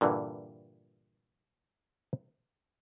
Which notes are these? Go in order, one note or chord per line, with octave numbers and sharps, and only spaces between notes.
G2 A#2 D3 E3